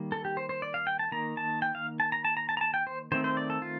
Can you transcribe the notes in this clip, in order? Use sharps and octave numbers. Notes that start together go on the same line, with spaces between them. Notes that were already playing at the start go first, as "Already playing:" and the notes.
Already playing: D#3 G3 A#3
A4
G4
C5
C5
D5
F5
G5
A5
D#3 A#3 A#5
A5
G5
F5
A5
A#5
A5
A#5
A5
A#5
A5
G5
C5
D#3 A3 C4 C5
C5
D5
A4
F4